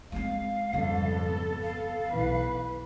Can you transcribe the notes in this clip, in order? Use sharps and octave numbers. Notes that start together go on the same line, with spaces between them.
G#3 C4 F5
F2 G#2 C#3 G3 B3 A4
F5
B1 E3 B4